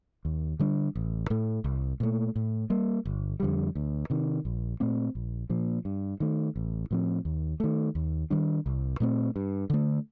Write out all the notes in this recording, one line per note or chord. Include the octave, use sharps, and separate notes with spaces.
D#2
D3 G3 D4
A1
A2 A3
C2
A#2 A3
A2
G3 A#3
G1
F2 D3 G3
D2
C3 D#3
A#1
A#2 A3 C4
A#1
A#2 F3 A#3
G2
D#3 A3
A1
A2 F3 C4
D#2
D#3 A3
D#2
D#3 G3 D4
C2
A#2 A3 C4
G2
D3 A3